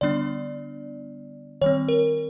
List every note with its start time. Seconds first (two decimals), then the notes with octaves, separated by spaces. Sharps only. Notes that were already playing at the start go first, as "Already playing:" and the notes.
0.01 D3 G3 B3 D4 D5
1.61 D#3 G3 C4 C#5
1.88 A#4